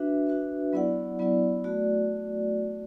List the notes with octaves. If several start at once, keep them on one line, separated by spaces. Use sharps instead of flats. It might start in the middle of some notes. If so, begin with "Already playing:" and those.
Already playing: D4 F#4 B4 E5
D4 F#4 B4 E5
F#3 B3 E4 D5 F#5
F#3 B3 E4 D5 F#5
A3 F#4 D5